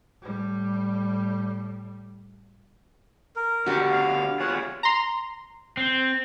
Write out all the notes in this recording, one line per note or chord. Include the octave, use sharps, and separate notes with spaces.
A2 G3
A#4
B2 D3 F#4 G4 B4
F5
B3 F4 G#4 C#5 F#5
A#5 C6
C4